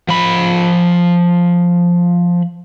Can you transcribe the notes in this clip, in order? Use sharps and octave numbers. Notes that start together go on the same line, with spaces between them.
F3 B5